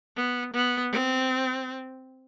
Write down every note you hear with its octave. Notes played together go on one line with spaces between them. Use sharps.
B3
B3
C4